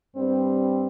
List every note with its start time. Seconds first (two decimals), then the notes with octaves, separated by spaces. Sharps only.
0.13 G2 G3 C4